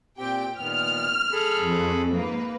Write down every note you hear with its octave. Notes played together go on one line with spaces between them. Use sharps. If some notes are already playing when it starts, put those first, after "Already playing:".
A#2 C4 G4 G5
A#2 D#3 B3 F6
G#4 A4 B5
F2
G#2 A#3 B4